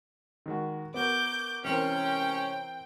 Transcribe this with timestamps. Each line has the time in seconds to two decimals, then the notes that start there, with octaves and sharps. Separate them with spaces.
0.46 D#3 G#3 F#4
0.94 B3 F#4 A#4 D6 G6
1.64 C3 E3 G#3 C4 C#4 A#4 G5